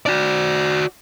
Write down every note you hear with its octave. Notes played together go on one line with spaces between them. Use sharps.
F#4 D5